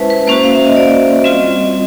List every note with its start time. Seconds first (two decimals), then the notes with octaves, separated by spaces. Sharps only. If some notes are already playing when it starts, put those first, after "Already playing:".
Already playing: G#3 C#4 E4 B4 C5 E5 A5
0.10 B4
0.27 A#3 C#4 F#4 C5
0.43 F5
0.54 E5
0.65 D#5
0.76 D5
1.24 G3 C4 F4 D#5